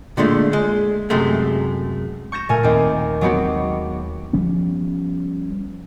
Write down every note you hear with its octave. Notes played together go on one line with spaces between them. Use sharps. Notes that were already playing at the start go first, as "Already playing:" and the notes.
A#2 D3 G#3 A3
G#3
F#2 C3 G#3 A3
C#6 G6 A#6 E7
A#2 A3 A#4 G#5
D#2 C4
F#3 G#3 B3 C4 F#4 G4
F3 G3 B3 C#4